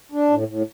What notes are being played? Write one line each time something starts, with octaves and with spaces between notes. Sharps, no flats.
D4
A2
A2